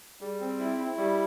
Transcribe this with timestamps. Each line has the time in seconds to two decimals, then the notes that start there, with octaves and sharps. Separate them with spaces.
0.21 G3 G#4
0.40 C4
0.59 E4
0.78 E4
0.97 G3 G4